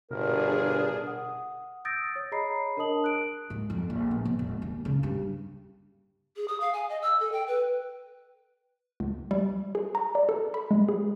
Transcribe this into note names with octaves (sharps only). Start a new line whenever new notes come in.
G1 B2 D4 G#4 A#4
F#5 D#6
D#6 E6 G6 A6 A#6 D7
C#5
G#4 C#5 D#5 A#5 B5 C7
D4 A#4 D#5 A5 D#6 F#7
F#6 D7
G#2
F2
A#1
B3
D#1
E1
D#2
C#3
G2
G#4
D#6
F5
G#5
D#5
E6
A4
G5
B4
C#2
G3
G#4
A#5
D5
A4
B5
G#3
G#4